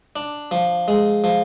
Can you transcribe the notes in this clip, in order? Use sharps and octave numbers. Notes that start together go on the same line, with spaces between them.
D4
F3
G#3
F3